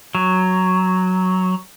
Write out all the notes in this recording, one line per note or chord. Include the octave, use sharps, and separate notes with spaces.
F#3